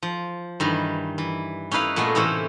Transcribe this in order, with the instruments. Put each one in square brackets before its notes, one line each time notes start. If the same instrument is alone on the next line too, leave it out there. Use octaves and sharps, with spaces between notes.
[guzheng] F3
G2 D#3 E3
E3
C#4 D#4 E4 B4 F5
A#2 A3 B3 G#4 D#5
A2 C3 E3 C#4 E4 C5